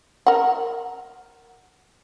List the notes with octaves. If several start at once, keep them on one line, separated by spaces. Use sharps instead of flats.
A#4 F#5